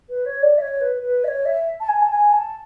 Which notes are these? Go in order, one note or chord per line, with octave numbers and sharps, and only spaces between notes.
B4
C#5
D5
E5
C#5
B4
B4
E5
C#5
E5
A5
G#5
A5
G#5
A5